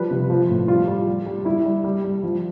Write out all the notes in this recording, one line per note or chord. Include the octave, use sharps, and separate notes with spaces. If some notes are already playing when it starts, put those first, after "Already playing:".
Already playing: F3 G3 B4
C3
F3
A2
G3 F4
G3
G3
G3
G3 E4
G3
G3
G3
F3